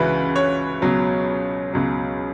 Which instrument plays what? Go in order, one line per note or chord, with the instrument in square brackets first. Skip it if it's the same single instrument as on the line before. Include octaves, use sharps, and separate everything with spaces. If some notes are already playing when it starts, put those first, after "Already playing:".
Already playing: [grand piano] C#2 C#3 E3 F#4 B4
C#5
C#2 B2 F#3
C#2 B2 F#3